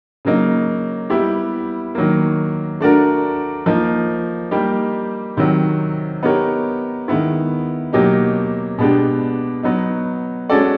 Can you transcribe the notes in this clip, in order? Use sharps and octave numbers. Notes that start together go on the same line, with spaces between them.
C#3 F#3 A#3 D#4
G3 B3 E4 G4
D#3 F#3 A#3
A3 D4 F#4 A#4
F3 A#3 D#4
G3 A#3 D#4 G4
C3 D#3 F#3
B3 D#4 G4 A#4 C#5
D#3 G#3 B3 E4
B2 F#3 A#3 D#4 G4
B2 G#3 B3 D4 G4
F#3 B3 D#4
G#3 C#4 F#4 A4 D5